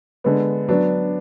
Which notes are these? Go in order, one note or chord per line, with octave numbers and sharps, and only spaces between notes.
D3 G#3 B3
F#3 B3 D4